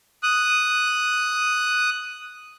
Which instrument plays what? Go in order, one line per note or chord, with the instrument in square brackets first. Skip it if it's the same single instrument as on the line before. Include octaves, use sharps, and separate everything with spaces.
[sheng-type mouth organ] D#6 F#6